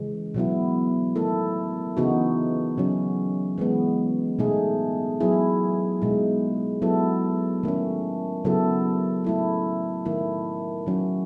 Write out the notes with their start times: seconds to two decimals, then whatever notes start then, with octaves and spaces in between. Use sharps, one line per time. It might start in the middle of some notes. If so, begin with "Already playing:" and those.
Already playing: C#3 E3 G#3
0.34 B2 F#3 B3 E4
1.15 D#3 A3 E4 A4
1.97 C#3 E3 B3 D#4 F#4
2.78 C#3 F#3 C#4
3.58 E3 G#3 B3
4.39 B2 A3 D#4 G#4
5.21 F#3 B3 E4 G#4
6.02 B2 G#3 D#4
6.82 F#3 B3 E4 A4
7.63 D#3 A3 C#4
8.45 C#3 F#3 B3 E4 A4
9.24 A3 E4 A4
10.05 D#3 A3 E4
10.86 D#3 F#3 C#4